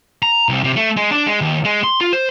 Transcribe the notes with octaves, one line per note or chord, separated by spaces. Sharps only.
A#5
C2
C3
A3
G#3
D4
G#3
D#2
G#3
C6
F4
C5